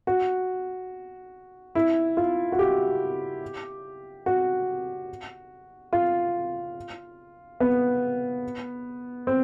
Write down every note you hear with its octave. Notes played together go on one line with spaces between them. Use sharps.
F#4
E4
F4
F#4
G4
F#4
F4
B3
C4